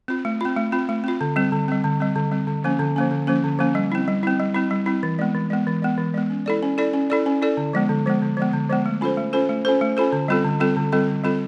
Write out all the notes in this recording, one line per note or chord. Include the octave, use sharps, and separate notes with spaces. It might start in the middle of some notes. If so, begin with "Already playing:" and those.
C4 F4
A3
C4 F4
A3
C4 F4
A3
C4 F4
D3
G3 C4
D3
G3 C4
D3
G3 C4
D3
G3 C4
D3
F3 A#3 C#4
D3
F3 A#3 C#4
D3
F3 A#3 C#4
D3
F3 A#3 C#4
G3
C4 E4
G3
C4 E4
G3
C4 E4
G3
C4 E4
E3
G#3 B3
E3
G#3 B3
E3
G#3 B3
E3
G#3 B3
C#4
E4 A4 D5
C#4
E4 A4 D5
C#4
E4 A4 D5
C#4
E4 A4 D5
D3
F3 G#3 B3
D3
F3 G#3 B3
D3
F3 G#3 B3
D3
F3 G#3 B3
A3
C#4 F4 A4 C5
A3
C#4 F4 A4 C5
A3
C#4 F4 A4 C5
A3
C#4 F4 A4 C5
D3
G3 C4 F4 A4
D3
G3 C4 F4 A4
D3
G3 C4 F4 A4
D3
G3 C4 F4 A4